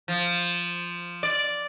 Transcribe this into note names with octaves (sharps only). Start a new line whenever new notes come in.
F3
D5